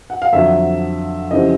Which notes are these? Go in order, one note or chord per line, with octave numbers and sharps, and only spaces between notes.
F#5
F5
F2 D3 F#3 E5
F2 C#3 E3 G3 C4 D#5